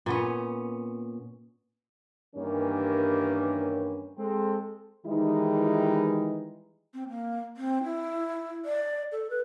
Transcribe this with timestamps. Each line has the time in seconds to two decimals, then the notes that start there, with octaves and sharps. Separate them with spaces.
0.06 A#2 B3 C#4
2.35 G2 D#3 E3 G3 A#3 C#4
4.18 G#3 C4 A4
5.06 D#3 E3 G3 G#3 D#4 E4
6.94 C4
7.09 A#3
7.57 C4
7.84 E4
8.65 D5
9.12 A4
9.30 B4